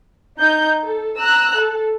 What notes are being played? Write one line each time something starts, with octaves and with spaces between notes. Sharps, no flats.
D#4 G6
A4
A#5 E6 F#6
A4